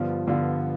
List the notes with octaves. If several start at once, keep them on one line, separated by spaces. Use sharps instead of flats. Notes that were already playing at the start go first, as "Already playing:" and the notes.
Already playing: G2 D3 F3 B3 F4
G2 D3 F3 B3 F4